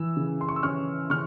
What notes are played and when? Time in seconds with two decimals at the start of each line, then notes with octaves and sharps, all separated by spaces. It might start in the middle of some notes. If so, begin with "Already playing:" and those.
Already playing: E3 E6
0.17 C#3
0.41 C6
0.49 C#6
0.56 E6
0.63 C#4 C#6 F6
1.10 C#3 C#6 F6